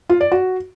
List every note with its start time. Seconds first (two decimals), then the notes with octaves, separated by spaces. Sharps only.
0.09 F4
0.21 D5
0.32 F#4